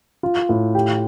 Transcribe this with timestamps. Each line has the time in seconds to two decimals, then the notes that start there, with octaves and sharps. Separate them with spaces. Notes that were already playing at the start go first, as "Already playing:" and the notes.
0.23 F4
0.49 A2
0.75 G4